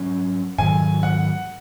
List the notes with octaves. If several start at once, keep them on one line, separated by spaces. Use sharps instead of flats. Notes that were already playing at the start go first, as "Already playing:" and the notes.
Already playing: G#2 F#3 C#4
G#2 D#3 F#3 G#5
F#5